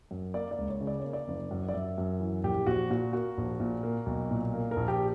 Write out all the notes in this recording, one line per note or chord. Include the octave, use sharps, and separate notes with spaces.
F#2
A#3 D5
D5
C#2
C#5
C#3
D5
A#3 C#5
D5
F#1
F#2
D5
F#2 E5
F#2
E3
A#1 G4
A#1 F#4
A#2 F#4
A#3 F#4
A#1
A#2
A#3
B1
A#2
A#3
A#4
A#1
G4